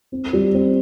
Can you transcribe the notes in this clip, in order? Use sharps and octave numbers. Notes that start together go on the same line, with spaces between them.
C4
G3
C4